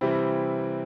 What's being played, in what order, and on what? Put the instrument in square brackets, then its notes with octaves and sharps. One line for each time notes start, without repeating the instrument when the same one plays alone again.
[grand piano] C3 E3 G3 C4 E4